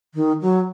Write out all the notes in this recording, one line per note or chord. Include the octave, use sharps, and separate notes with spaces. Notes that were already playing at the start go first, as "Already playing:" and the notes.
D#3
F#3